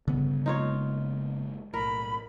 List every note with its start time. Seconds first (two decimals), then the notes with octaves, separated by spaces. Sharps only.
0.08 G1 G2 C#3 B3
0.46 F#1 G#3 A#3 D#4 F4 C#5
1.74 B1 A2 A#4 B5